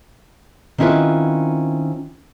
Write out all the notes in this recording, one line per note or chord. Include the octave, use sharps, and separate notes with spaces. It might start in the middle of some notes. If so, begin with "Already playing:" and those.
D#3 C4 C#4 E4 F4 B4